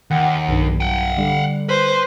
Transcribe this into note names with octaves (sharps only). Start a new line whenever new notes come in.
D#2 F#5 G5
B1 G2
F#5 G5
D3 G3
B4 C5